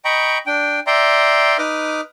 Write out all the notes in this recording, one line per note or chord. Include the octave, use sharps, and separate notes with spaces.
D#5 G5 A#5 B5 C#6
D4 G5
D5 E5 G5 A#5 C6
D#4 B4 D6 D#6 F6